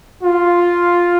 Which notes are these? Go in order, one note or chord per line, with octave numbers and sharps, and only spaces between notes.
F4